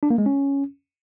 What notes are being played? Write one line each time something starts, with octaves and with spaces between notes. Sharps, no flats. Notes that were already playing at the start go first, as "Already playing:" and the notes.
D4
A#3
G#3
C#4